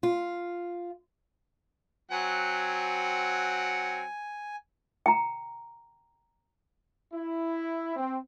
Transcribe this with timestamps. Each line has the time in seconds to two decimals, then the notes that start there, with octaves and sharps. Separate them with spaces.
0.03 F4
2.11 F#3 C4 F#5 G#5
5.06 G5 A#5
7.13 E4
7.96 C4